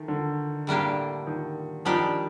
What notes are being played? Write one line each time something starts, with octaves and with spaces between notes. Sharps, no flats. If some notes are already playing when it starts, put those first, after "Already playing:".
Already playing: D#3 A3
D3
A2 G3 A#3 D4 G4
D#3
D#3 F3 G3 D4 G4